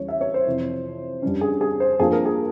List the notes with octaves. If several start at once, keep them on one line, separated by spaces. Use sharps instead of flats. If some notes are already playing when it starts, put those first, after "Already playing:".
Already playing: E2 E3 G3 C#4 E4 C#5
E5
C#5
C5
F2 C3 E3
G2 G3 C#4
G#4
G#4
C5
G2 F3 A#3 G#4
A#4
G#4